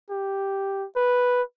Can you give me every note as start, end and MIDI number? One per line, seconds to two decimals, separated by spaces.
0.10 0.86 67
0.96 1.42 71